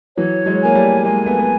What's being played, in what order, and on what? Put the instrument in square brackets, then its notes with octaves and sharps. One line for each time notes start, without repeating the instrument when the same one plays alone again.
[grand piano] E3 F#3 [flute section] C#5
[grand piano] F#3 G#3
[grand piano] A#3 [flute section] G#5
[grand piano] G3 A3
[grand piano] G#3 A#3 [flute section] G#5
[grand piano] A3 B3
B3